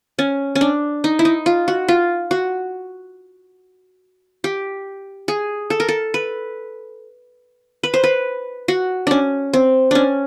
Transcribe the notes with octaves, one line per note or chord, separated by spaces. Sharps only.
C#4
C#4
D4
D#4
E4
D#4
F4
F#4
F4
F#4
G4
G#4
A4
A#4
A4
B4
B4
C5
B4
F#4
C#4 D4
C4
C#4 D4